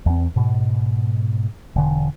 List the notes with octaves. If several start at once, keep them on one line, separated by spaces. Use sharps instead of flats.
E2 C4
G#2 B2
E1 D3